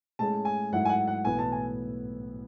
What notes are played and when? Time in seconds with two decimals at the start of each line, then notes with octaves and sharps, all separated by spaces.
0.19 A2 G#3 C#4 G#4 A5
0.45 G#5
0.72 G#2 F#3 A3 E4 F#5
0.85 G#5
0.89 F#5
1.07 F#5
1.25 B1 A2 E3 B3 E4 G#5
1.38 A5
1.52 G#5